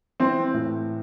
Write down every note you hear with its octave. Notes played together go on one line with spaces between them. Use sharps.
E3 C4
A2